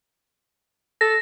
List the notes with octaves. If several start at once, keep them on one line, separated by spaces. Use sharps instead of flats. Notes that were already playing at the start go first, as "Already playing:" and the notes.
A4 A#6